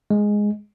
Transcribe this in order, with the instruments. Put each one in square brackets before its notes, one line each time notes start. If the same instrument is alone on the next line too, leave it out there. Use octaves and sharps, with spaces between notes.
[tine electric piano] G#3